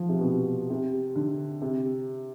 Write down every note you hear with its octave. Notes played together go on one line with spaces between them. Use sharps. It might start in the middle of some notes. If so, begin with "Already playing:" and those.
Already playing: F3
C3
B2
C3
C3
D3
C3